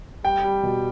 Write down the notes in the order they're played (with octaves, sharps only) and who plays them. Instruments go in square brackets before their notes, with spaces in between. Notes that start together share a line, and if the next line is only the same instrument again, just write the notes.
[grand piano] G3 G5
G3
B2